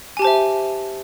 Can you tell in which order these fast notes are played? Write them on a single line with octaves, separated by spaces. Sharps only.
G#5 G4 A5 C5 E5